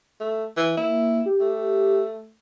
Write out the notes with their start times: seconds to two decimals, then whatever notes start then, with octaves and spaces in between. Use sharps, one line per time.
0.20 A3
0.57 E3
0.77 A#3 E4
1.26 G4
1.41 A3